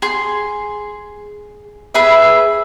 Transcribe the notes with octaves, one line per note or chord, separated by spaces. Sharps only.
G#4 C6
G#4 B4 E5